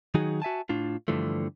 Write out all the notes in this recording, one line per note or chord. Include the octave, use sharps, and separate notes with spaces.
D#3 F#3 D#4 F#4 G#4
F#4 E5 G#5 A5
A2 D4 F4
G2 D3 E3 F3 A3